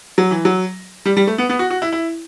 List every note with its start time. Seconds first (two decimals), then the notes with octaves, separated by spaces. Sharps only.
0.18 F#3
0.31 E3
0.45 F#3
1.05 G3
1.17 G3
1.27 A3
1.38 B3
1.49 B3
1.59 F#4
1.71 F#4
1.82 E4
1.92 E4